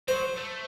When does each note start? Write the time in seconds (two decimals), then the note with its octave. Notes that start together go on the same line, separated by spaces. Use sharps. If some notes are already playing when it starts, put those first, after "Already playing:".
0.08 F#3 C5
0.36 A3